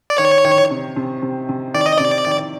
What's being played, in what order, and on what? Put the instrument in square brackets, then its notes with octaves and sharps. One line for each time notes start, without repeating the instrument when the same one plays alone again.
[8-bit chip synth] D5
[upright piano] D#3 [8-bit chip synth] C#5
[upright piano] D#3
C3
C3
C3
C3
[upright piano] D#3 [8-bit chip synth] D5
[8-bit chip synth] D#5
[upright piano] C3 [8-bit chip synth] D5
[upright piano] D#3